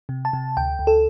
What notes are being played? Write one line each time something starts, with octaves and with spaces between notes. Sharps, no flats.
C3
A5
C3
D2 G5
D2
A4